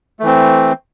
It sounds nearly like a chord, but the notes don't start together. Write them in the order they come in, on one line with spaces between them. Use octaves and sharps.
A3 E3 C4